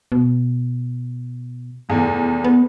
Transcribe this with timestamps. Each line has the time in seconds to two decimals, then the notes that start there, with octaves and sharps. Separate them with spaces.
0.12 B2
1.89 F1 E2
2.44 B3